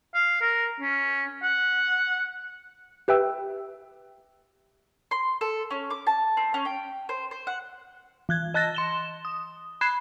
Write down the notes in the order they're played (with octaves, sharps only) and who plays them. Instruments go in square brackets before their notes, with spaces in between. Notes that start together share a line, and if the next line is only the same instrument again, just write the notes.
[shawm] F5
A#4
C#4
F#5
[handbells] G4 B4 E5 G5 E6
[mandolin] C6
A4
C#4
D6
A5
C4
C#4
G5
C5
C5
F#5
[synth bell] E3 F#6 G#6
D#5 A5 F#6 A6 A#6
C6 E7 G7
D#6
B5 F#6 G#6 C7 E7